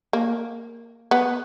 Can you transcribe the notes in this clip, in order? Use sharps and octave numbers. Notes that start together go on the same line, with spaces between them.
A#3
B3